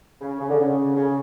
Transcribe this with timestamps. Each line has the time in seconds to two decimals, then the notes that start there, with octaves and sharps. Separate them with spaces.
0.21 C#3
0.40 C#3
0.50 D3
0.60 C#3
0.96 C#3